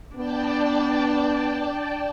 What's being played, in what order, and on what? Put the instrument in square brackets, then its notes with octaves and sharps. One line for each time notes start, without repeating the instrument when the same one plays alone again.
[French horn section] B3 [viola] D4 [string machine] D5 G5 A5